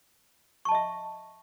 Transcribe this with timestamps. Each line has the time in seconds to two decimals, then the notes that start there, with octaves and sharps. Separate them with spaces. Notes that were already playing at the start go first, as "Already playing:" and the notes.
0.65 C#6
0.69 A5
0.72 D#5
0.75 E5